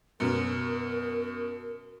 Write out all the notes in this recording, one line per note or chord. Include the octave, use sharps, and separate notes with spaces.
F#2 B2 A#4